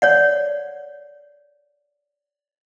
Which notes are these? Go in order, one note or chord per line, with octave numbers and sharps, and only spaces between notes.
C#5 D5 F#5